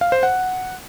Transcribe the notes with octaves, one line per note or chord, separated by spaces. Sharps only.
F5
C5
F#5